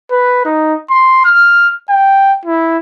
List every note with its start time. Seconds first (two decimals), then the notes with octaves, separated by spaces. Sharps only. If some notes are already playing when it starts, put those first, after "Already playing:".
0.11 B4
0.45 D#4
0.90 C6
1.25 F6
1.90 G5
2.45 E4